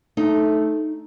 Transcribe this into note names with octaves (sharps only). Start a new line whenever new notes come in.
A3 D#4